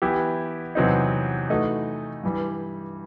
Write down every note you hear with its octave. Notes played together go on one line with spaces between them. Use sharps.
E3 B3 E4 G4
E2 C3 F#3 C4 D#4
E3 A3 D#4 F#4
G2 E3 G3